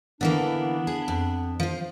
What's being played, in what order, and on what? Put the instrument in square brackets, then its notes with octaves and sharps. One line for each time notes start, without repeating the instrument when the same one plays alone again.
[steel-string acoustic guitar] D3 E3 A#3 [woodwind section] B3 D4
[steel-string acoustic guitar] G#4
F2
F3 C5